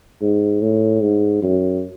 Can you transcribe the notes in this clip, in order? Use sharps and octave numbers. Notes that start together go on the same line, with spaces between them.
G#2
A2
G#2
F#2